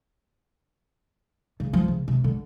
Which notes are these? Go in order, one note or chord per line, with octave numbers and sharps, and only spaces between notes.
C#3
F3
C#3
C3
D3